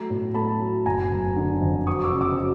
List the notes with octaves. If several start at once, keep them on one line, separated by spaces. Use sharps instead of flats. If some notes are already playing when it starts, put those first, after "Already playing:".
Already playing: F#3 A3 A#5
A2
A3 A5 B5
F#3
F#1 G#5 A#5
F#1
D3
F2
F#3 C#6 D#6
D6 E6
C#3
D6 E6
F#3